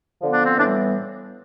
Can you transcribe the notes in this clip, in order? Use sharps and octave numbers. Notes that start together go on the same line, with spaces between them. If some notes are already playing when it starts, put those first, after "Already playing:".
D3 F3 B3
D4
C4
A2 E3 G3 B3 D4